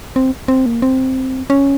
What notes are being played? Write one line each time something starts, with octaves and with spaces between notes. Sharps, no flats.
C4
C4
A#3
C4
C#4